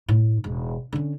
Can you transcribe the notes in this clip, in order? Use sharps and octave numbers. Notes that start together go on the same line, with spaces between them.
A2
E1
D3 C#4